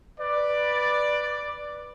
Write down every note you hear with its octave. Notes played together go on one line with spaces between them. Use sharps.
B4 D5